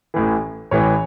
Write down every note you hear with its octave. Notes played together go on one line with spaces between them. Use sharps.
A1 A2 E3
A1 A2 E3 C#5